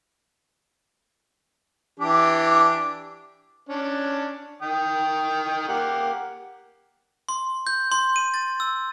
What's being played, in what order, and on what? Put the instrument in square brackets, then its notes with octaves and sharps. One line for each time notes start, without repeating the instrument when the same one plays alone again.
[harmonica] E3 D4 G4
C#4 D4
D#3 G5 D#6
A#3 G4 F#5
[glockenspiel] C6
G6
C6
D#7
A6
E6